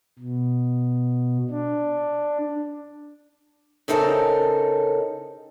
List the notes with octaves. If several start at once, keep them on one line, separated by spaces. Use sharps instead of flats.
B2
D4
C#3 C4 D#4 A4 A#4